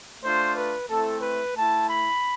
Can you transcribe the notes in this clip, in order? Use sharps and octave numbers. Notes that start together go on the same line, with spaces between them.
A3 D4 F4 C5
B4
A3 C4 E4 A4
B4
A3 E4 A5
B5